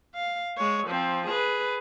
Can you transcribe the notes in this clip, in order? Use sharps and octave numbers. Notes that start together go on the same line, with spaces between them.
F5
G#3 C#5
F3 C4
G#4 B4